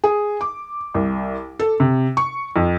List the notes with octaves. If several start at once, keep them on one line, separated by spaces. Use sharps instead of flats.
G#4
D6
C2
A4
C3
C#6
F2